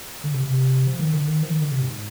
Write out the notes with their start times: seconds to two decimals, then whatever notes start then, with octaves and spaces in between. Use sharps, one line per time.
0.24 D3
0.34 C3
0.44 C3
0.87 F3
0.99 D#3
1.13 D3
1.27 D#3
1.42 F3
1.50 D#3
1.61 D3
1.71 C3
1.81 G#2